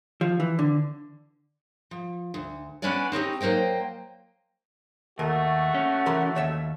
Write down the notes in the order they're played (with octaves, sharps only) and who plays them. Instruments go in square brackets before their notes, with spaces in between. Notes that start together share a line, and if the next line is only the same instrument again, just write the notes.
[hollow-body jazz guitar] F3
E3
D3
[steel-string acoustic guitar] F3
D2
B3 C#4 D4 B4 D5 G#5
C4 C#4 D#4 G4
F#3 A#3 C5 D#5 G5
[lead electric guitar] D#2 [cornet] A3 [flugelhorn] F#4 [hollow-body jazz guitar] A#4
[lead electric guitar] C#4
[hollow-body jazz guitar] E3 A#4 C6
[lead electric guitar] D#2 [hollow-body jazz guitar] C#5 E5